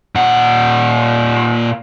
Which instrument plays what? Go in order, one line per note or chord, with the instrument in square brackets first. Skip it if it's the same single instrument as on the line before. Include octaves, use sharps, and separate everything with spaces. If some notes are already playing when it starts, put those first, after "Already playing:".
[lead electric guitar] A#2 F#5